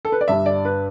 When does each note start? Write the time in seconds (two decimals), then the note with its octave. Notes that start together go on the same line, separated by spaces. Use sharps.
0.05 A4
0.12 B4
0.21 D5
0.28 G1 G2 G3 D4 E5
0.46 D5
0.65 B4